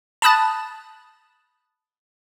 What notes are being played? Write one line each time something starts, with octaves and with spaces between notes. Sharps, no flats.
A5 B5 D#6 F#6 A6